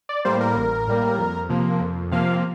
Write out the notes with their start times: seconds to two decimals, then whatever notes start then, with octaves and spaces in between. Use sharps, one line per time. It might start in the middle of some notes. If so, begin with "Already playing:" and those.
0.09 D5
0.25 A2 G3 A#3 C5
0.41 A#4
0.56 A1
0.87 A2 G3 A#3
1.18 F2
1.49 C3 F3 A#3
1.80 F2
2.12 C3 F3 A#3 F5